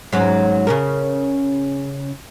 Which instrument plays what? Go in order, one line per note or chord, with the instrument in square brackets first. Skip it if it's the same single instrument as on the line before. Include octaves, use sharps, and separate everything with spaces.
[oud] G#2 F#3 C#4
C#3 C#4 A#4